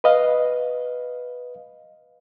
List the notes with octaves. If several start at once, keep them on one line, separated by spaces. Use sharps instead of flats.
B4 D#5 F5